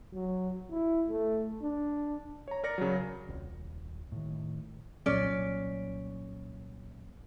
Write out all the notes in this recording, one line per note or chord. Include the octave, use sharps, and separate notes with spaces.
F#3
E4
A3
D4
C#5 A#5
A#4 D5 A#6 C#7
C#3 F#3
D#1 C2
A2 D#3
C2 A#2 F#3 C#4 D5